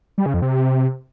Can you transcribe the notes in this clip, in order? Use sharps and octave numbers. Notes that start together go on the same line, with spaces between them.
G3
C#3
F2
C3